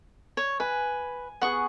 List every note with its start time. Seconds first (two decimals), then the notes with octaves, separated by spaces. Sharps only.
0.37 C#5
0.60 B4 G#5
1.42 B3 G#4 F#5 C#6